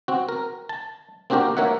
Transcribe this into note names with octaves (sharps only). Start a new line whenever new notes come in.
C4 F#4
A#4
A5
A#3 C4 D4 F#4 G4 A#4
A#3 A#4 C#5 E5 F#5